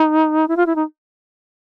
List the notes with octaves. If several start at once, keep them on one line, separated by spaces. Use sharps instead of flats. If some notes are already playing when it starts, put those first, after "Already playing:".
Already playing: D#4
E4
F4
E4
D#4